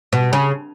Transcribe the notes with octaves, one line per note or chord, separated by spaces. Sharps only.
B2
C#3